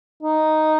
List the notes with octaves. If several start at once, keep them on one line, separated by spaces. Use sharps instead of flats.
D#4